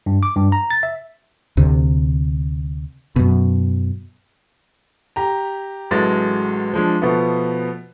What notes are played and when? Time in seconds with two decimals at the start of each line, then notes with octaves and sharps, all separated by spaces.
0.06 G2
0.23 D6
0.36 G2
0.52 A#5
0.71 A6
0.83 E5
1.57 D2 C3
3.16 F#2 B2
5.16 G4 A#5
5.91 A1 F#3 G#3 A3 A6
6.73 F3 G#3 D4
7.02 B2 F3 A3 B3